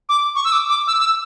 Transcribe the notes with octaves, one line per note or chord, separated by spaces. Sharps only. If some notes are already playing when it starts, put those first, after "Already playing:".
D6
C#6
E6
D6
D6
E6
E6